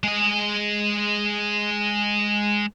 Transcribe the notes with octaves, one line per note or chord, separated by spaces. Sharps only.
G#3 D#5